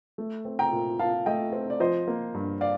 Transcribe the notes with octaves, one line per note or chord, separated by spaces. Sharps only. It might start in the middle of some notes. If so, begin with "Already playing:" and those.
A3
C4
G5 A#5
A#2
A#2 F5 A5
A3 D#5 G5
C4
D5
F3 C5 D#5
A#3
G2
D5 F5